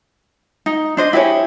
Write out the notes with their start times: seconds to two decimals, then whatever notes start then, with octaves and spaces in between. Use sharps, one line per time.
0.66 D#4
0.97 D4 C5 D#5
1.13 E4 G4 G#4 C#5